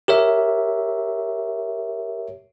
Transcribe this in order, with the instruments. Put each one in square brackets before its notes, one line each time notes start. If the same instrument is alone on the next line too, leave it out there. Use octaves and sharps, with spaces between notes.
[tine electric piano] G4 A#4 C#5 E5